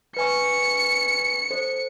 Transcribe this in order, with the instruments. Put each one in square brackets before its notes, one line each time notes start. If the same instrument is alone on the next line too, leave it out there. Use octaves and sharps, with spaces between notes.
[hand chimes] B4 G#5 C#6 [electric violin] C#7
[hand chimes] A4 C5